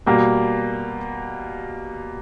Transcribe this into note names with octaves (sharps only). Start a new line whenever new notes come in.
B2 G3 A#3